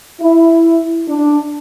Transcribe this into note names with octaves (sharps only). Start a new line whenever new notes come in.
E4
D4